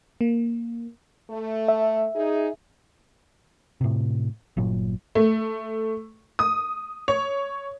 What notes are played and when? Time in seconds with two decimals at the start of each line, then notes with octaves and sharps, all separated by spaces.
0.21 A#3
1.31 A3
1.68 E5
2.16 D#4 G#4
3.81 A2 C3
4.57 G1 A#2 F#3
5.15 A3
6.39 D#6
7.08 C#5